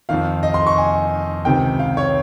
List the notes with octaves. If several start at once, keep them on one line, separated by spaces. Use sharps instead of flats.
F2 D#3 F5
D#5
C6
C#6
G#5
C#2 C3 D#3 G5
F5
C#5